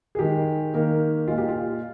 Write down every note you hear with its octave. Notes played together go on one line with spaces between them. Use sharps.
G#4
D#3 G#3 G4
D#3 A#3
A#2 G#3 F4
G4
F4